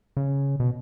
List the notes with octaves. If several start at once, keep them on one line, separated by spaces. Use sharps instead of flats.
C#3
B2